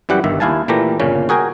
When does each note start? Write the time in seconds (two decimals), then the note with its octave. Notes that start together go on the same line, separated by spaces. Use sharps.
0.09 F#2 E3 G3 G4 F#5
0.24 G1 G2 D#3 E5
0.40 D#2 E4 F5 G#5 A5
0.68 A#2 E3 A3 G4 A#5
1.00 G1 A#2 C#3 C#4
1.29 F#4 G#4 A#4 G5 G#5